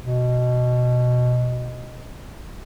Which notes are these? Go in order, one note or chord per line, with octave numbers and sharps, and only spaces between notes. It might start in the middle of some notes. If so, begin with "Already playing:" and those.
B2